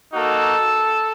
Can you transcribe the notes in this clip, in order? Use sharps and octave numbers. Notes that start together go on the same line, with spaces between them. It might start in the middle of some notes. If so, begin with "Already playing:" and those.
A#3 D#4 F#4 A4